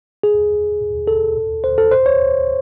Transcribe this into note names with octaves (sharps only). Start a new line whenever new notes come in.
G#4
A4
C5
A4
C5
C#5